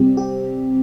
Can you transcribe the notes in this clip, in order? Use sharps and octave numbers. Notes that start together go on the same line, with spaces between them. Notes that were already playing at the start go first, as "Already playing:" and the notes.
Already playing: C3 G3 C4 G4
G4